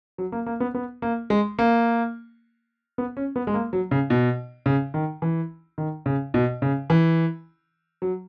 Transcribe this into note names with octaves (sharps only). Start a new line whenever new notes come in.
F#3
A#3
A#3
B3
B3
A#3
G#3
A#3
B3
C#4
B3
G#3
A#3
F#3
C#3
B2
C#3
D#3
E3
D#3
C#3
B2
C#3
E3
F#3